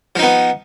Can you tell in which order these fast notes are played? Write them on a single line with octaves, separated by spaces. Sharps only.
F3 D#4 B3